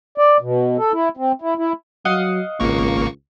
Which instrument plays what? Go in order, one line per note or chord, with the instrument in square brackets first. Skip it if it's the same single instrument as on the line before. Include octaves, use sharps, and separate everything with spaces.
[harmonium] D5
B2
A4
E4
C4
E4
E4
[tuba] F#3 [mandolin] D#5 F5 F#5
[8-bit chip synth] G#1 A#3 C#6 [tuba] C#2